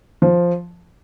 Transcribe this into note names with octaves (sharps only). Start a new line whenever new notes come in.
F3